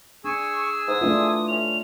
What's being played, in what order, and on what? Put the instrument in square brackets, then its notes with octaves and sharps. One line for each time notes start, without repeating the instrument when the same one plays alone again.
[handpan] D4 [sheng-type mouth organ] G#4 G#5 E6 [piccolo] C#6
[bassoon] G#2 [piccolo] D#6
[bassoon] E3 [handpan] A3 D4 F4
[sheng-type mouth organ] C#4 [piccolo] F7